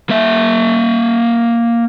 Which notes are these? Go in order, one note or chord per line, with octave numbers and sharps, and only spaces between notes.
A#3 E5